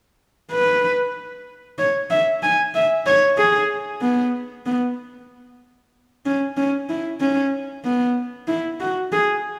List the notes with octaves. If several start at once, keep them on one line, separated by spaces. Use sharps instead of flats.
B4
C#5
E5
G#5
E5
C#5
G#4
B3
B3
C#4
C#4
E4
C#4
B3
E4
F#4
G#4